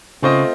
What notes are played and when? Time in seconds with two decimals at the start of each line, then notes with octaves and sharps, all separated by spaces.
0.22 C#3 A3 C4 F4 C5 D#5